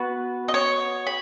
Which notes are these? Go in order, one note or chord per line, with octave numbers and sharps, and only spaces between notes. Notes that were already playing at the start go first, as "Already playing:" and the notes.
Already playing: B3 F#4 B4
D#5
C#5
B5